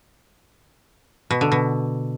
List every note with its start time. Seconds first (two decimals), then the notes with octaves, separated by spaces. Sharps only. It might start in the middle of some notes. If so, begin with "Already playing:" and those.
1.31 B2
1.41 D3
1.52 B2